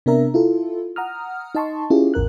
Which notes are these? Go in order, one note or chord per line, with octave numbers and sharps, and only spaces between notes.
C3 B3 D4 A#4 E5 A#5
E4 F4 A4
F#5 A#5 D#6 F6
D#4 D#5 A5 C6 C#6
C#4 E4 F4 G4 G#4
A1 E2 A#4 F#6